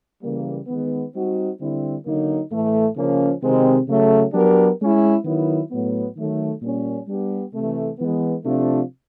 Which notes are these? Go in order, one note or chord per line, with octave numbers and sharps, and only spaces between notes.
C#3 E3 G3 A#3
D#3 G#3 B3
G3 C4 D#4 F#4
D3 G3 C4 E4
D3 F#3 A#3 D#4
A2 E3 A3
C#3 F3 A#3 C#4
C3 D#3 G#3 C4
C#3 F#3 A3
F#3 B3 D4 G4 A#4
G#3 C#4 E4
D#3 F#3 B3 E4
A2 F#3 B3
D#3 F#3 A3
A#2 G3 A#3 C#4
G3 B3 D4 G4
C3 E3 A3
E3 G#3 B3
C3 F3 A3 D4 F4